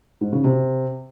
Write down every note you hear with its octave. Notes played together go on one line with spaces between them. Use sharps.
G#2
C#3
C3